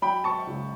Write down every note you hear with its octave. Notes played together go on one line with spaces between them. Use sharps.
F#3 G5 B5
A5 C#6
C#2